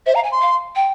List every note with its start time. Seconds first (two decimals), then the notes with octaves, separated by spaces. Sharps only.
0.06 C5 E5
0.15 F5 A#5
0.23 G#5
0.32 C6
0.41 F5
0.75 G5